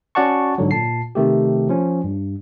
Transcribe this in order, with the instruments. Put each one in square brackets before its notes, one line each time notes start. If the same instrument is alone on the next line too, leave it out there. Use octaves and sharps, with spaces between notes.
[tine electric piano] C#4 F#4 D5 F#5 A5 C#6
G#2 D3 F#3
A#2 A5 C7
C3 D#3 A3 G4
F3 C#4
G2